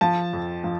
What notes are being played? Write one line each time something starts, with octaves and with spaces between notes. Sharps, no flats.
F3 A5
F2
F3